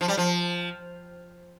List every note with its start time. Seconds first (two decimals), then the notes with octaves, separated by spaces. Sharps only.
0.01 F3
0.08 G3
0.17 F3